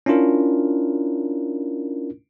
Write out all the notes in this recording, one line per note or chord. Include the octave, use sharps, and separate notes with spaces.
C#4 D4 E4 F4 A#4